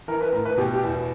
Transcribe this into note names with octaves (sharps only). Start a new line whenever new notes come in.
E3 A#4
B4
A2 A#4
B4
B2 G4
G4
E2